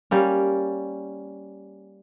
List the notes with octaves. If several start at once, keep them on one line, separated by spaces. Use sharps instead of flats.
G3 A#3 C#4